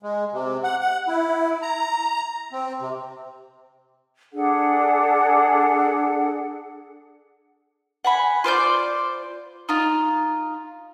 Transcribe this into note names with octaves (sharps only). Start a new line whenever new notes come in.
G#3
C3
F#5
F#5
E4
A#5
C4
C3
D4 G#4 A4 F#5
F#5 G#5 B5
F4 C5 D5 G6
D#4 F4